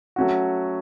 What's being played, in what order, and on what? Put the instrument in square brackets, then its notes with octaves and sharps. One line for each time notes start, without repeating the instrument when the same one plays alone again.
[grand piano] F#3 A3 C#4 F#4